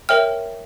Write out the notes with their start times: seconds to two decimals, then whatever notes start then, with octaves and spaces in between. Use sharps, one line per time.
0.09 A#4 C#5 E5 G5 F6